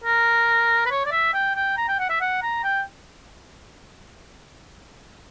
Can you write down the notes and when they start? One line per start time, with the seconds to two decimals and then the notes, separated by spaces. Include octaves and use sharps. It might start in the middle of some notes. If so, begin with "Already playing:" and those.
0.04 A#4
0.86 B4
0.91 C#5
1.06 D5
1.12 E5
1.34 G5
1.56 G5
1.77 A#5
1.88 G5
1.99 F#5
2.10 E5
2.21 F#5
2.42 A#5
2.64 G5